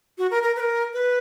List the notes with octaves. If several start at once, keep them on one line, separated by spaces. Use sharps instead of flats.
F#4
A#4
A#4
B4
A#4
B4